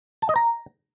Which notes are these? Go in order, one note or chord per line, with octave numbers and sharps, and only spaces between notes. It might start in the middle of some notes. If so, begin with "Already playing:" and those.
A5
D#5
A#5